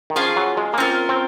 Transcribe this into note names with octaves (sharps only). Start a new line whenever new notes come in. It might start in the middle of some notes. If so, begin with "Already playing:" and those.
D#3
F3 C#4 F4 G#4
F#3
G#3
A#3
C4 C#4 F4 A#4
C4